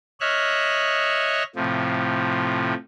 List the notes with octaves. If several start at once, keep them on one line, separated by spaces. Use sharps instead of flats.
C#5 D#5 E5 F6 F#6
A2 C3 F3